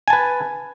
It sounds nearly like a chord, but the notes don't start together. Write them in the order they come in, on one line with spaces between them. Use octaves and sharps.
G#5 A5 B4